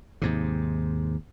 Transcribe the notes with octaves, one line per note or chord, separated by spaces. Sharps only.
D#2 G#2 C3